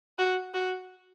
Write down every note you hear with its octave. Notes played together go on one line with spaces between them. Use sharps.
F#4
F#4